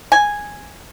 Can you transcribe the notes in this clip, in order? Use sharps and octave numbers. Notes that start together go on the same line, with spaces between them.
G#5